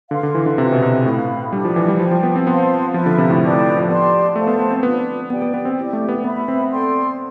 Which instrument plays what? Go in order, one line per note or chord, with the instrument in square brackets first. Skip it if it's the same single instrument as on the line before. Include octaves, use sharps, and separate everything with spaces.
[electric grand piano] D3 [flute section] B4 F5 C6
[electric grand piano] D3
E3
D3
[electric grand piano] C3 [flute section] F4 B4 E5
[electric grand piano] B2
C3
[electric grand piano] A2 [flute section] B4 F5 B5
[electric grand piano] G3 [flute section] D4 G4 D5
[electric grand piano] F3
E3
G3
[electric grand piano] F3 [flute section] G4 C5 G5
[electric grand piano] F3
B3
C4
[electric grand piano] B3 [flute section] C5 F5 A5 C6
[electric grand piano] F3 [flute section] F4 B4 E5
[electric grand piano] D3
C3
A2
[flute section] G4 B4 D5 A5
[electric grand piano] A2
F3
[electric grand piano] B3 [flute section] G4 D5 A5 C6
[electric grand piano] A3 [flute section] A4 C5 F5 A5
[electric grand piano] B3
B3
C4
[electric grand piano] B3 [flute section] D4 F4 B4
[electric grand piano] B3 [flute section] G4 D5 G5
[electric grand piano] B3
B3
C4
[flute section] E4 G4 D5
[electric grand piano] A3
B3
[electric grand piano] B3 [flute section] B4 E5 B5
[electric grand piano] C4
[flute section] A4 D5 G5 C6